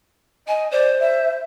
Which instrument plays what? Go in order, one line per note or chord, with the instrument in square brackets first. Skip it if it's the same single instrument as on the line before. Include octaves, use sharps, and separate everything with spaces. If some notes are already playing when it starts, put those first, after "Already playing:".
[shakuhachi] D#5 [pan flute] G#5
[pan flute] C5 [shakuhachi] D5
[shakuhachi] E5